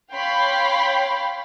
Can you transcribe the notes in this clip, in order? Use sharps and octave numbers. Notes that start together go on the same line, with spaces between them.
C#5 F5 G5 B5 C6